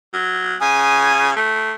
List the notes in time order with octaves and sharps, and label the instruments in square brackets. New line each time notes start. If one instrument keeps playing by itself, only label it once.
[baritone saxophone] F#3
[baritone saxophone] C#3 [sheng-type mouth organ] G#5 D#6
[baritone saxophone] A3